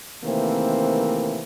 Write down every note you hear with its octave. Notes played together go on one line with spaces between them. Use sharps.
C3 D#3 E3 A3 A#3 C4